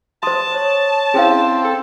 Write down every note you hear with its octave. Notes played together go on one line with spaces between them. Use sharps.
C5 A5 C6 D#6 A6
C#5
C4 C#4 E4 G#4 C5 F5
A4